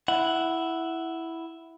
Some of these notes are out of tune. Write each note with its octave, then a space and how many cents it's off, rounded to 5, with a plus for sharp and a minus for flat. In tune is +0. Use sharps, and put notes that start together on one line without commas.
E4 +0 F#5 +0